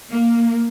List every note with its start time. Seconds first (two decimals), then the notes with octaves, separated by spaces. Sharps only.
0.11 A#3